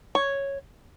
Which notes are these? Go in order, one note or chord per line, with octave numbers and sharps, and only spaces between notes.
C#5